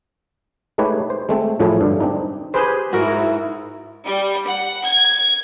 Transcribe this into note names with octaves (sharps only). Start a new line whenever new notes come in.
G#3 A3 D#4 G4 B4 C#5
C5
G#3 A3 C4
A2 F3 F#3 A3 E4 G#4
G2 D3
C4 D4 D#4
G4 G#4 B4 C5
G#2 E4 F#4 A#4
G3
F#5
G#6